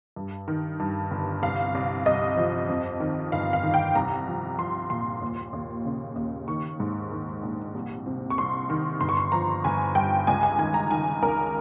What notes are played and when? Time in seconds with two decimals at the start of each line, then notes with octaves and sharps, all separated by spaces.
0.16 G2
0.48 D#3
0.80 G2
1.11 G1
1.42 C2 F5
1.75 C2
2.06 C2 D#5
2.37 F3
2.68 F2
3.00 D#3
3.32 G1 F5
3.53 F5
3.63 D#3
3.74 G5
3.95 C2 A#5
4.27 F3
4.58 F3 C6
4.90 A#2 C6
5.21 D#2
5.53 D#2
5.85 C#3
6.16 D#2
6.48 D#3 C#6
6.80 G#2
7.11 D#3
7.43 A#1
7.75 C2
8.06 C3
8.30 C#6
8.38 C2 C6
8.70 D#3
9.00 G1 C6
9.09 C#6
9.17 C6
9.32 F3 A#5
9.64 G1 G#5
9.95 G2 G5
10.27 C#2 G#5
10.43 G#5
10.59 D#3 G#5
10.74 A#5
10.90 D#3 G#5
11.23 C#2 A#4